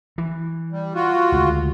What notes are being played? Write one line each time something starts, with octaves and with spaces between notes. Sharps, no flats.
E3
G3
F4 F#4
D2 C#3 G#3